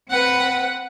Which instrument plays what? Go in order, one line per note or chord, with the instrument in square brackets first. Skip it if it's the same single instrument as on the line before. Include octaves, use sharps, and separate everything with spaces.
[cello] C4 B4 [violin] F#5